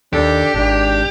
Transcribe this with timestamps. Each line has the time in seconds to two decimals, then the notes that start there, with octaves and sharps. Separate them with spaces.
0.13 D#2 D4 G4 A4
0.54 G#1 D4